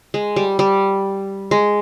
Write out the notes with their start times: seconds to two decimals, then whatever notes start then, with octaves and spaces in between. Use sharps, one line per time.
0.14 G#3
0.36 G3
0.59 G3
1.51 G#3